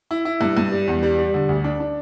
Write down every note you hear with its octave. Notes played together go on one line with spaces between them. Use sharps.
E4
E4
G2
G2
G3
E2
G3
G3
D3
D2
D4
D4